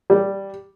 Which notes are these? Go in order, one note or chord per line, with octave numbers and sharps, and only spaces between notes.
G3